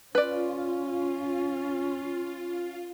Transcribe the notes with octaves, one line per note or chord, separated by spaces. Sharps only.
C#4 F4 B4 D5